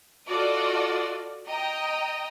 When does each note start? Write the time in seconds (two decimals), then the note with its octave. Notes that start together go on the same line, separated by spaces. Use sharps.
0.28 F4 F#4 A4 D5 D#5
1.48 D#5 G5 A#5 D#6